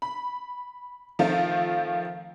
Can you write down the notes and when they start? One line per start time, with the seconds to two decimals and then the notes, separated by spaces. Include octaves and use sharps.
0.02 B5
1.19 D#3 F3 A3 C4 F4